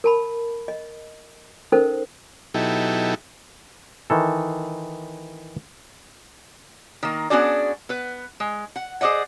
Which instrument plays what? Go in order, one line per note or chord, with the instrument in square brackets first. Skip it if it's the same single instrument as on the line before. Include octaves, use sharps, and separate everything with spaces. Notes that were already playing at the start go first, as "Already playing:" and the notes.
[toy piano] A#4 A5 B5
D#5
C#4 D#4 A4 A#4 C5
[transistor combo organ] B2 F#3 D#4 E4 G4 A4
[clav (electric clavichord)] D#3 E3 A4
[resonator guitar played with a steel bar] D#3 A#3
B3 C#4 D4 F#4 G#4 D5
B3 B4
G#3
F#5
G#4 C5 D5 D#5 F#5